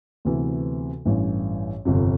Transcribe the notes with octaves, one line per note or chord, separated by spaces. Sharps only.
D2 C3 E3 B3
A1 G2 E3
G1 F2 C3